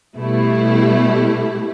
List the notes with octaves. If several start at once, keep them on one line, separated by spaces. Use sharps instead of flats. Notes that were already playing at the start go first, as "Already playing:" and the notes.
B2 G3 A3 E4